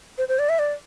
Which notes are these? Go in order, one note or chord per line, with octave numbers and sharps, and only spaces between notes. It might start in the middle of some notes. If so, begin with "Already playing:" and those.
C5
C5
D5
E5
D5